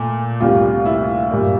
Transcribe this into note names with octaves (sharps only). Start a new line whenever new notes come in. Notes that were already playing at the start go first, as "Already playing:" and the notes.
Already playing: A#2 A3
D2 C3 G3 A#3 F4
E4
A#2 G3 A#3